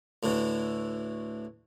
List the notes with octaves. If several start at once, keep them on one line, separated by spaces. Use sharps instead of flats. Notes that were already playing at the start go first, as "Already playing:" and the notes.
D2 A2 D3 E3